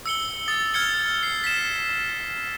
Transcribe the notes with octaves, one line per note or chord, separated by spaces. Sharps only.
E6 C#7 G7
D#6 A6
F6 G#6 C#7 G7
C7
B6 E7